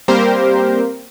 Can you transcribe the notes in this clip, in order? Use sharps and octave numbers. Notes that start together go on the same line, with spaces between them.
G3 A#3 C4 G4 A#4 C5